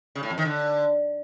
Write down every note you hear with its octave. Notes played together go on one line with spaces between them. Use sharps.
C#3
A2
F2
D#3
D3